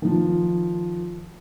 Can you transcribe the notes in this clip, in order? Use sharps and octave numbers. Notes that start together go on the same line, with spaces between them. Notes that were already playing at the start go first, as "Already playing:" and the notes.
D#3 F3